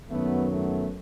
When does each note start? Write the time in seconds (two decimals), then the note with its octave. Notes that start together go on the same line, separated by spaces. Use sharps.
0.10 F#2 D#3 F#3 A3 B3
0.51 A3 B3